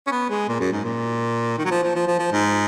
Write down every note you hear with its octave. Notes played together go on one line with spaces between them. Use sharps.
C#4
B3
G#3
A#2
F#2
G#2
A#2
D#3
F#3
F3
F3
F3
F3
F3
G#2